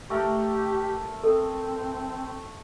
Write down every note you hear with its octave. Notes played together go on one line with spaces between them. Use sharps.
A3 G4 A#4 C#6
C4 A4